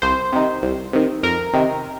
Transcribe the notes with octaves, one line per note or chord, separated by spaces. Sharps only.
C2 C5
C3 D#3
C2
C3 D#3
F2 A#4
C3 D#3